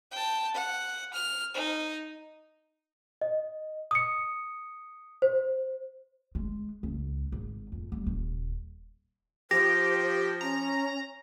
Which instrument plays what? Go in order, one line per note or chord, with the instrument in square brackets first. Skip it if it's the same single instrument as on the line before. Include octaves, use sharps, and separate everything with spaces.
[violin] G5 A5
F#5
F6
D#4
[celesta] D#5
D#6 C#7
C5
[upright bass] G#3
C#2
G#1
F2
G3
D#1
[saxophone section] F3 [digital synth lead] G4 [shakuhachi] C5 [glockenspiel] A#6
[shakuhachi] C#4 [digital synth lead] A#5